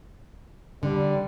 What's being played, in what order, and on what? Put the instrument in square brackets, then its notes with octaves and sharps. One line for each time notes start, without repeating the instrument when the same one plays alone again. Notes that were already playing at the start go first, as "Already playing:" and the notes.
[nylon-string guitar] D3 [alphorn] G3